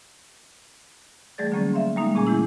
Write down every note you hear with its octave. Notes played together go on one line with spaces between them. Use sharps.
E3 G3 A3 G#4 D5 A6
D3 F#3 A#3 C#4
E5 F5 C6
G3 G#3 A#3 D#4
A#2 C#4 G#4 G#5 D6
E3 A3 E4